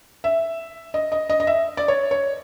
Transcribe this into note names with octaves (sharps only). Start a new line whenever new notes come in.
E5
D#5
D#5
D#5
D#5
E5
D5
C#5
C#5